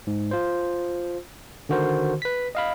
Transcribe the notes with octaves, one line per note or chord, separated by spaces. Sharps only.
G#2
F4 C5
D3 D#3 F#4 A#4 C5
B4 B6
D#5 F5 B5